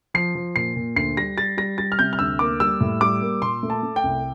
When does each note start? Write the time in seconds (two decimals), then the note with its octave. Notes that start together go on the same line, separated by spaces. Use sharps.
0.14 F3 C7
0.35 F3
0.56 A#2 C7
0.76 A#2
0.96 D2 C7
1.17 G3 A#6
1.38 G3 A6
1.58 G3 A#6
1.78 G3 A6
1.92 F6
1.99 C3 G6
2.13 F6
2.19 D2 E6
2.39 A#3 D6
2.60 G3 E6
2.81 A2
3.01 G3 D6
3.22 A#3
3.42 A#2 C6
3.63 A3
3.70 A5
3.83 A3
3.96 G5
4.03 C2